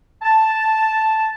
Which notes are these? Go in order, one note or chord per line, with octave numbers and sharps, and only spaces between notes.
A5